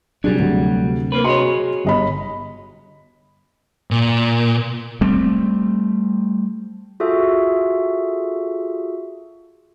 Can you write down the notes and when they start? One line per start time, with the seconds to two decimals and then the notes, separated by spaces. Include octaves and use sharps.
0.24 C3 F#3 G3 D4 G#4
0.39 D2
1.12 A#3 C4 B4
1.24 F#4 G#4 C#5 D#5 C6
1.85 G1 D#5 B5
3.91 A#2
5.01 G3 A3 C4
7.00 F4 F#4 G#4 A4 E5